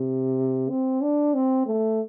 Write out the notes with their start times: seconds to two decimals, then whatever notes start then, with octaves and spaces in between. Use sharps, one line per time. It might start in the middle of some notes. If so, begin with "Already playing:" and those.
Already playing: C3
0.69 C4
1.02 D4
1.34 C4
1.67 A3